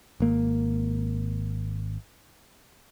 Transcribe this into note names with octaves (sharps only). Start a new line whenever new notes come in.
G#1 A#3